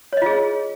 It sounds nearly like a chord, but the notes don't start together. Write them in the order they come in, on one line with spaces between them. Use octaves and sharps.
C#5 D#5 F4 G#4